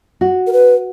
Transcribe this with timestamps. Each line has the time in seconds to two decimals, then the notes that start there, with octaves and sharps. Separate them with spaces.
0.21 F#4
0.47 A#4
0.53 B4